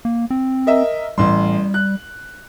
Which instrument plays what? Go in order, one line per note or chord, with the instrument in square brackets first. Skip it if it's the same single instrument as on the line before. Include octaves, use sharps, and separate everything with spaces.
[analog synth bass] A#3
C4
[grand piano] A#4 D#5 E5
[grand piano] A1 C6 [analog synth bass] G3
[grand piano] F#6